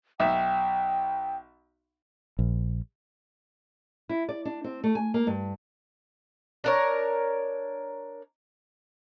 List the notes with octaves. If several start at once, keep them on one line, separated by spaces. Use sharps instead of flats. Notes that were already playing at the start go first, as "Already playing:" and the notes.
B1 E5 G5
A#1
E4
D5
D4
C4
A3
G#5
A#3
G2
D4 A#4 C#5